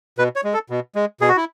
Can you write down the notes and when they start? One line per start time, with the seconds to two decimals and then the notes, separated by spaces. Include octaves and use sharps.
0.18 B2 B4
0.36 C#5
0.44 G#3
0.54 A4
0.70 B2
0.95 G#3
1.21 B2 G#4
1.29 F#4
1.37 E4